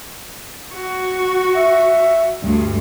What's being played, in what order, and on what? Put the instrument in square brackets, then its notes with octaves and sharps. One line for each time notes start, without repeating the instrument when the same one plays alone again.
[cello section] F#4
[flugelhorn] E5
[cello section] D2 G2 G3